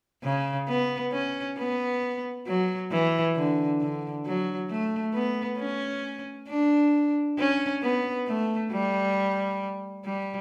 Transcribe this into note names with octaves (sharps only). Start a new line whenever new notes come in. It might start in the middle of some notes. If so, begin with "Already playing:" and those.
C#3
B3
C#4
B3
F#3
E3
D3
D3
F#3
A3
B3
C#4
D4
C#4
B3
A3
G3
G3